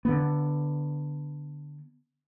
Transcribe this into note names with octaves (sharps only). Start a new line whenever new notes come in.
D3 B3